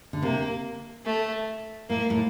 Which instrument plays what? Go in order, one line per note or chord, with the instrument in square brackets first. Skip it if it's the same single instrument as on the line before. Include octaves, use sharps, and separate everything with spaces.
[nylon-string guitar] D3
[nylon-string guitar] C3 [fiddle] A#3
[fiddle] A3
[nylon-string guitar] A2 [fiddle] A#3
[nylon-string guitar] A2